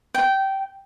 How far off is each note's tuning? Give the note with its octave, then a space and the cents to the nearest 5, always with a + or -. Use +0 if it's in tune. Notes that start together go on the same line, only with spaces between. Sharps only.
G5 -15